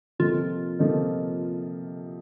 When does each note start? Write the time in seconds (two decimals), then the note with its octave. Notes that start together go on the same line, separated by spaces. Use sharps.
0.19 C3 F3 A#3 D#4 F4 A4
0.79 C3 F3 A#3 D#4 A4